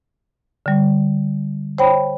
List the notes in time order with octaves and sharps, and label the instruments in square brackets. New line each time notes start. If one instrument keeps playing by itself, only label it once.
[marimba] D3 G3
C5 C#5 G5 B5